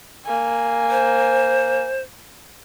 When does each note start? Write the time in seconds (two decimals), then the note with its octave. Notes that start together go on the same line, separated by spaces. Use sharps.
0.26 A#3 G#5
0.90 C5